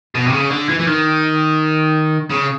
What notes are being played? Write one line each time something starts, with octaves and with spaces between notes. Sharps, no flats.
B2
C3
C#3
D3
E3
E3
D#3
C#3